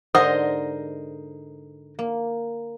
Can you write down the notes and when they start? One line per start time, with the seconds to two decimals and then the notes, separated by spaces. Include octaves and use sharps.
0.15 G#2 D3 A#4 C5 D#5 F#5 D#6
1.99 A#3